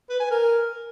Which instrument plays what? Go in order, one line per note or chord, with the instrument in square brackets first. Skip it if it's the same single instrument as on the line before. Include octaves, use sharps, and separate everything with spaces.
[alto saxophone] B4
G#5
A#4